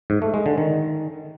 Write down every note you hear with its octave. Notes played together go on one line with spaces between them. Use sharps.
G#2
A3
G#3
D3
D#3